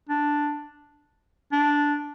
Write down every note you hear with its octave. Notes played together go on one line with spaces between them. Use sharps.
D4
D4